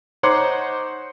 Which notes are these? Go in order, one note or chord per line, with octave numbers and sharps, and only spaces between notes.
D#4 C5 C#5 F#5 C6 D6